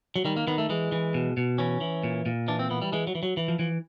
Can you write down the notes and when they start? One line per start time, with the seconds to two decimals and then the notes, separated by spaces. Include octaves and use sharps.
0.16 F#3
0.25 D#3 G3
0.37 A#3
0.47 D#3 B3
0.58 A3
0.69 E3 G#3
0.92 E3
1.14 B2
1.37 B2
1.58 E3 C#4
1.81 E3
2.04 A#2
2.26 A#2
2.48 E3 D4
2.59 C4
2.70 E3 B3
2.82 G3
2.92 E3 G#3
3.07 F#3
3.15 E3
3.23 F#3
3.37 E3
3.48 F3
3.59 E3 F3